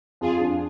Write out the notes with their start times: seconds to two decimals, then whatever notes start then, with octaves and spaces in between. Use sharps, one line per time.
0.21 F2 F4 G#4
0.40 D4